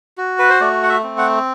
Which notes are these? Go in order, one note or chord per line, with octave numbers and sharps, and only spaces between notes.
F#4
B4
C5
A3 D5
F#5
E5
C4
F#5